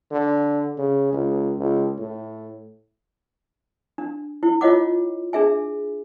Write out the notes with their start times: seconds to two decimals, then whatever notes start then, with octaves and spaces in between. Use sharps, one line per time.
0.12 D3
0.78 C#3
1.13 C#2
1.59 C#2
1.99 A2
3.98 D4
4.43 E4
4.61 F4 C#5 D#5 F#5 D6
5.33 D4 G#4 E5 G#5